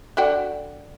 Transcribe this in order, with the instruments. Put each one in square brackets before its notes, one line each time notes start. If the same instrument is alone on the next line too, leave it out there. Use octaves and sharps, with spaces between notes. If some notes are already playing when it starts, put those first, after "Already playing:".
[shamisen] D4 F#4 G5 [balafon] A4 D5